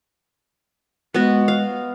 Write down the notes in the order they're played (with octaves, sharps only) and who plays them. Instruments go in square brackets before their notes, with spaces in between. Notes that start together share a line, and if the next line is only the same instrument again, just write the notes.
[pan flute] G#3 [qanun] B3 F#4
[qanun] F5